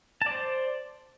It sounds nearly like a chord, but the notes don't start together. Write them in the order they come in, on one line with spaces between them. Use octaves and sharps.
A5 D5 C5